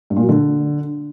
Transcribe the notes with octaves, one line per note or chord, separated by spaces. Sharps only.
G2
A#2
F#3
D3